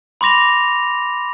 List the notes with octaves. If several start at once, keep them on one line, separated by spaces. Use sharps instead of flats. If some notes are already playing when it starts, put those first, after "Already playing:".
B5 C6 D6 A#6 F7